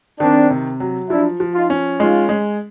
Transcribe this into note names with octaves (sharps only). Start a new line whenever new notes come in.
D#3 C4 D4
C3
F#3
F3 D4 E4
F3
D#4 F4
C#4
G#3 D#4 F4
G#3